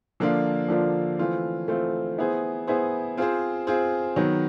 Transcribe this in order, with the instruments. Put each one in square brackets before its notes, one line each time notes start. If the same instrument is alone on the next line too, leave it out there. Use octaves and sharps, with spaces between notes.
[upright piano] D3 F3 A#3 D4 F4
D3 F3 A#3 D4 F4
E3 A3 C4 F4
E3 A3 C4 F4
B3 E4 G#4 C5
B3 E4 G#4 C5
C4 F4 G#4 C5
C4 F4 G#4 C5
D#3 F#3 B3